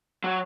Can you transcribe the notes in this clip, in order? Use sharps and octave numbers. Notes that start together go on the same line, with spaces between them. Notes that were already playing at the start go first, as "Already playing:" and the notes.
F#3